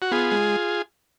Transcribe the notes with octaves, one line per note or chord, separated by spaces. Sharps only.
F#4
B3 F4 G#4
G#3